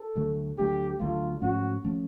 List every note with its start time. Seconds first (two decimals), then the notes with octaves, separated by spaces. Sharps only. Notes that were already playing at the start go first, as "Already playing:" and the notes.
Already playing: A4
0.15 D2 D3 F#3 A3
0.57 D2 D3 F#3 A3 G4
0.99 D2 D3 F#3 A3 F4
1.41 G#2 F3 A3 C#4 F#4
1.84 F3 A3 C#4